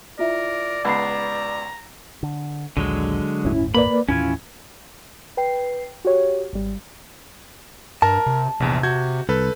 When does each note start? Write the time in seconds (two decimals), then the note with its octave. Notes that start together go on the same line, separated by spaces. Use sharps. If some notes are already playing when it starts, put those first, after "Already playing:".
0.19 E4 F4 A#4 D5 E5
0.85 C#2 B3 F#5 A#5 B5 C7
2.23 D3
2.77 A#1 D#2 D3 F#3 G#3
3.45 G1 D#2 A2 C#4 E4
3.75 A#3 B4 D5 B5
4.08 D#2 A2 E3 C#4 E4 F4 G#6
5.37 B4 G5 C7
6.05 F#4 G4 C#5
6.53 G#1 G3
8.02 G2 A#4 A5 A#5
8.27 C3
8.60 A#1 E2 C3
8.83 F#4 G6 G#6
9.29 C2 A4 B4